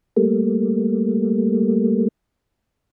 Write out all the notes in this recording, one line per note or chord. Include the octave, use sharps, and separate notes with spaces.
G3 A3 A#3